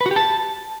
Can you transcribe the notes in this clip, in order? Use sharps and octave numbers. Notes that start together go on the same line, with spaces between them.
B4
F#4
G4
A5